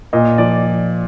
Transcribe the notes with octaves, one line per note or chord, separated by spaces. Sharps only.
A#2 D#5
F3 D5